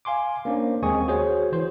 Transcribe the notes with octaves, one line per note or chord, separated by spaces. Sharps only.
F5 G#5 C6 D6
A#3 C#4 D4 C5
D#2 G#3 C4 G#5 C#6 D#6
F#4 G#4 C5 C#5
E3 C5